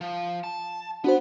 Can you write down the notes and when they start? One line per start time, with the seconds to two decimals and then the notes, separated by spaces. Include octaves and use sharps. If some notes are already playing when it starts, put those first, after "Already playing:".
0.01 F3
0.44 A5
1.04 B3 D4 F#4 C5